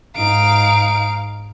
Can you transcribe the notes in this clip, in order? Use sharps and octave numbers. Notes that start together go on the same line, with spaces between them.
G#2 D#4 F5 D7